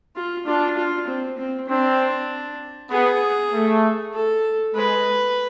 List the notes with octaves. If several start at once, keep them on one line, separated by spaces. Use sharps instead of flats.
F4
D4 F4
F4
C4
C4
C4 D4
B3 G#4
A3
A4
G#3 B4